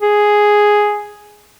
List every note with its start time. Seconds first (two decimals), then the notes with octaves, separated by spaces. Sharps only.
0.02 G#4